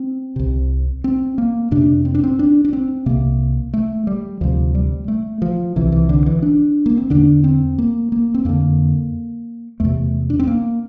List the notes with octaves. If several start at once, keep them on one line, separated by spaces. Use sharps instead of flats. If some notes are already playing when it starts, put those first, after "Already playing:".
Already playing: C4
C2 C3
C4
A#3
F2 C3 D4
C4
D4
C4
D4
D4
C4
C2 C3 A#3
A3
G3
D2 C3 F3
G3
A3
F3
C2 C3 E3
E3
D3
E3
D4
A#3
C4
E2 D3 D4
C4
A#3
A#3
C4
F2 D3 A#3
E2 C3 A3
D4
C4
A#3